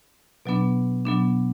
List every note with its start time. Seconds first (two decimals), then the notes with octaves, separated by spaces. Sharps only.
0.46 B2 F#3 B3 D4
1.05 B2 F#3 B3 D4